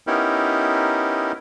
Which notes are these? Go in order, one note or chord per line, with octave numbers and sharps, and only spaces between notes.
B3 C#4 D#4 E4 G4 A#4